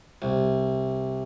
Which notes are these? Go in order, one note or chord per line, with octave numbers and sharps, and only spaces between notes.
C2